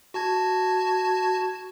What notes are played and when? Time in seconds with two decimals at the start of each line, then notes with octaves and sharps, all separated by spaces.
0.14 F#4 A5 G#6